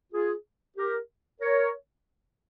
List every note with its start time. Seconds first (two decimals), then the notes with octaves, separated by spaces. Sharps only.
0.13 F4 G#4
0.76 G4 A#4
1.41 A#4 C#5